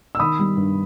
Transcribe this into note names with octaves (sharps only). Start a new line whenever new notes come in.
E6
D#3 B5 D#6
G3
G2